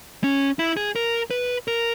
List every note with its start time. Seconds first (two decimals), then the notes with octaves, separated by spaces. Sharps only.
0.24 C#4
0.59 E4
0.77 G#4
0.96 A#4
1.31 B4
1.68 A#4